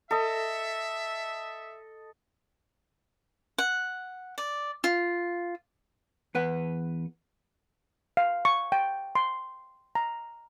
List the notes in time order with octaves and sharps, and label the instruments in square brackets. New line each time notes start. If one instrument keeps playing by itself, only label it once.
[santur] A4 D#5 [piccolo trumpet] E5
[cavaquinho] F#5
D5
F4
[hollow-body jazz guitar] E2 B4 F#5
[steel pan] F5
C#6
G5
C6
A#5